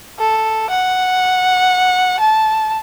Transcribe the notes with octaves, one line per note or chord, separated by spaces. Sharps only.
A4
F#5
A5